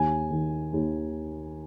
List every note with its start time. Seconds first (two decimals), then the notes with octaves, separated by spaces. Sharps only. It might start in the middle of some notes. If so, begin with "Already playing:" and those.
Already playing: D#2 G#5
0.31 D#3
0.73 D#2